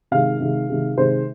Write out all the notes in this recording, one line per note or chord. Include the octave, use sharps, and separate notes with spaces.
C3 D#3 G#3 F5
C3 D#3 G#3
C3 D#3 G#3
C3 D#3 G#3 C5